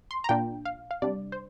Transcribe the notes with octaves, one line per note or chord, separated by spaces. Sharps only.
C6
A#5
A#2 A#3 D4 F4 G5
F5
F5
C3 G3 D4 D5
C5